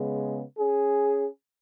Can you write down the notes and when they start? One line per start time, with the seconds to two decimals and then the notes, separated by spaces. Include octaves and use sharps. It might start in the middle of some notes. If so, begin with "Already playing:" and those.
Already playing: C#3 G#3 B3
0.58 C#4 G#4